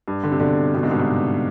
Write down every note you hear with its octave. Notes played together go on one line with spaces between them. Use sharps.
G2
D3
C3
B2 D3
B2 D3
G#2 C3
G2 B2
G#2 C3